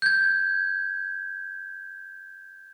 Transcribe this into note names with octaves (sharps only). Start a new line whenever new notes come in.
G6 G#6